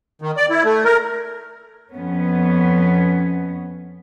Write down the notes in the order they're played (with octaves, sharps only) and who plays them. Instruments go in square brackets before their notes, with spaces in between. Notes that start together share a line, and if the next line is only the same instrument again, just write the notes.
[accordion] D#3
D5
E4
A3
A#4
[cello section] F2 B3 C#4